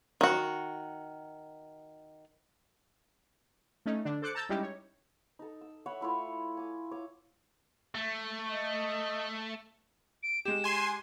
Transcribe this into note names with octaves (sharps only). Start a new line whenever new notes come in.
D#3 F#4
A3 C#4 D#4
D3 D4
A4 C5 D6 F#6 C#7
A5 A#5 E6 G6 A6
G3 G#3 C#4 D#4 E4 G4
C#5
D#4 A4
E6
C#5 E5 F#5 B5
A3 E4 F4 C#5
G#5 D6
C#5 D6
A3
D#5
D7
G#3 G4 E7
G#5 C6